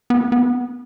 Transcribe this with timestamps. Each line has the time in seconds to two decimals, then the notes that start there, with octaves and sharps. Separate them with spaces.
0.10 B3
0.32 B3